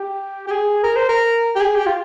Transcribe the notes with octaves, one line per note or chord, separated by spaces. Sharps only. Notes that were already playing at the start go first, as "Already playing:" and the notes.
Already playing: G4
G4
G#4
A#4
C5
A#4
G4
G#4
G4
F4